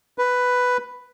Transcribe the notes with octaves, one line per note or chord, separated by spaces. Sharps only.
B4